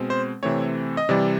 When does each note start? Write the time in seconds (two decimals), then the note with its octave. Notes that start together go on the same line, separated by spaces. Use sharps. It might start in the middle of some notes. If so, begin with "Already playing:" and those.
Already playing: B2 G#3 C4
0.10 C5
0.43 C3 E3 A3 C4 C#5
0.97 D#5
1.09 C3 E3 G3 D5